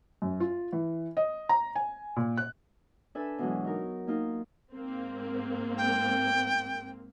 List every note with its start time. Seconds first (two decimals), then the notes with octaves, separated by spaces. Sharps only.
0.22 F#2
0.40 F4
0.72 E3
1.17 D#5
1.49 A#5
1.75 G#5
2.16 A#2
2.37 F#6
3.15 D4 A4 B4 E5 G#5
3.39 B2 E3 F#3 G#3
3.64 D#4 A#4
4.07 A#3 D#4 F4
4.73 G#2 A#3 C4
5.77 G5